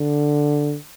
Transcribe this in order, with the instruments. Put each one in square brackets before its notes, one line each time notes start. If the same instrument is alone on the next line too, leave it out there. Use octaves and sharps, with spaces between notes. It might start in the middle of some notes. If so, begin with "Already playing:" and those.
Already playing: [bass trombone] D3